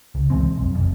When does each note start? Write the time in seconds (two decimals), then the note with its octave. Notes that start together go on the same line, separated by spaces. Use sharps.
0.15 C#2
0.30 B2 E3 G#3 C4
0.58 B1 F2
0.75 F1 F2